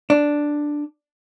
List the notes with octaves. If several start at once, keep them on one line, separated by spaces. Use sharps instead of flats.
D4